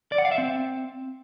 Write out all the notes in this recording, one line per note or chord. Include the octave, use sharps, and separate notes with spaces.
D5
F#5
F5
E5
C4